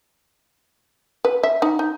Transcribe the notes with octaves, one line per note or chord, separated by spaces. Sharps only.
B4
E5
D#4
D#4